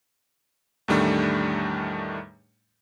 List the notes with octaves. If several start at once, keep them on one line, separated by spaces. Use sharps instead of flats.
E2 A2 D#3 G3 A3 D4